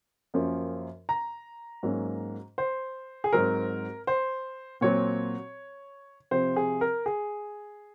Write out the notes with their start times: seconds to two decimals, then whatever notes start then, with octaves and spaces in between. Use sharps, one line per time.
0.34 F#2 F3 A#3 C#4
1.09 A#5
1.83 G#2 F#3 A#3 C#4
2.58 C5
3.24 G#4
3.33 G#2 F#3 C4 A#4
4.07 C5
4.81 A#2 F#3 C4 C#5
6.31 C3 F3 C4 C5
6.56 G#4
6.81 A#4
7.06 G#4